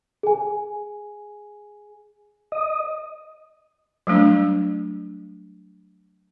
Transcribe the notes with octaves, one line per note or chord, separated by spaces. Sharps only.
G#4 G#5
D#5
F#3 G3 A3 D4